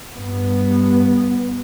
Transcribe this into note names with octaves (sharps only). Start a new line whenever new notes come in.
G2 B3